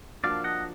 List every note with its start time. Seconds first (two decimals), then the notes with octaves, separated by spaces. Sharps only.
0.24 F3 A#3 D4 F#4 D5 F5
0.44 D#5 F#5